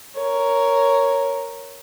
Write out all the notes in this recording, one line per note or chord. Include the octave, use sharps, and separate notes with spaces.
A#4 C#5